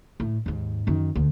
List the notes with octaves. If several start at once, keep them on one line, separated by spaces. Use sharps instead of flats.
A2
D#2 G#2
F#2 D#3
D2